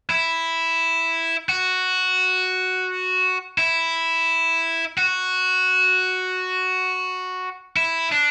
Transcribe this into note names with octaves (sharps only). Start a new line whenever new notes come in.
E4
F#4
E4
F#4
E4
D4